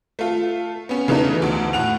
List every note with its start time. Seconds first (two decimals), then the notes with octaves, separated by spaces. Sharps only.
0.19 A3 F4
0.89 B3 C#4
1.08 C#3 E3 A3 B3 D#4
1.42 D2
1.73 A2 F#5 F7